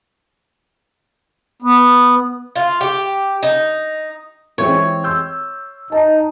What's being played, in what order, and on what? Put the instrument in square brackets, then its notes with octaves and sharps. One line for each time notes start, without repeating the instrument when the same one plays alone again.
[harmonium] B3
[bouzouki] F4
G4
D#4
[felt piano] E3 G#3 C4 [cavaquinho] C#5
[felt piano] C6 E6 G6
[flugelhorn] D#4 [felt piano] A5